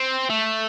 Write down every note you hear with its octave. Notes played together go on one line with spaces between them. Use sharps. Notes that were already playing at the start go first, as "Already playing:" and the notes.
Already playing: C4
A3